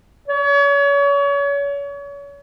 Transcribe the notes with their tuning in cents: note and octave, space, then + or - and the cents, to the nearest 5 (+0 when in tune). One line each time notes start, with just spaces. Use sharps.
C#5 +35